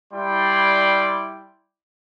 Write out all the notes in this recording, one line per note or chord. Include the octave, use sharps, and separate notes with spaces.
G3 E4 D5 G5 C6